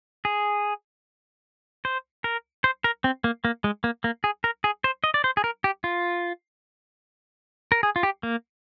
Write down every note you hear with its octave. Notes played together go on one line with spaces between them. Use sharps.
G#4
C5
A#4
C5
A#4
C4
A#3
A#3
G#3
A#3
A#3
G#4
A#4
G#4
C5
D#5
D5
C5
G#4
A#4
G4
F4
A#4
G#4
F4
G4
A#3